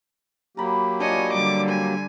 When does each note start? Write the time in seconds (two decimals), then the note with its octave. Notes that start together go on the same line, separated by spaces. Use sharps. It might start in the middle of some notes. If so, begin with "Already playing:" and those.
0.57 F#3 A#3 G4 A#5 B5
1.00 D4 F4 C#5 D#5 G#5
1.33 D3 G3 D6
1.69 G#5